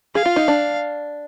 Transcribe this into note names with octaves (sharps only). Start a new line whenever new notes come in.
G#4 F5
F4
D#4
D4